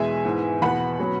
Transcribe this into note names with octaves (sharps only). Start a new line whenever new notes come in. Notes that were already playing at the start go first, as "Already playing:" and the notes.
Already playing: E2 B2 G#3 E5 G#5
G#2 E3 B3
E2 B2 B3 F#5 B5
B2 F#3 C#4